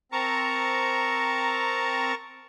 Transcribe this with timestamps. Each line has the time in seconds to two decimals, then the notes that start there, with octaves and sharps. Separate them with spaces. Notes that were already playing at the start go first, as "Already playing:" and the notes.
0.12 C4 A#4 A5 A#5 C#6